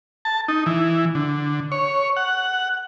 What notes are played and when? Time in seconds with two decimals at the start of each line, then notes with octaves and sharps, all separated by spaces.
0.25 A5
0.48 D#4
0.66 E3
1.15 D3
1.72 C#5
2.17 F#5